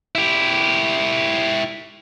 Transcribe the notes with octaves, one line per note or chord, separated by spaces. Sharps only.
E4 G4